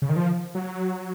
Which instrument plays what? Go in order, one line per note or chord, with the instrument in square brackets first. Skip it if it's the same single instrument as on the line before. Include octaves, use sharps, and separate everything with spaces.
[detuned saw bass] C#3
D#3
F3
F#3